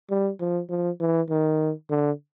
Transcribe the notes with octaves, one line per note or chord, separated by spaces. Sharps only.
G3
F3
F3
E3
D#3
D3